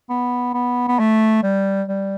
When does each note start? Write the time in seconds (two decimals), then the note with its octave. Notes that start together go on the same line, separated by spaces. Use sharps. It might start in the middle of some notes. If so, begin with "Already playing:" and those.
0.09 B3
0.54 B3
0.88 B3
0.99 A3
1.43 G3
1.88 G3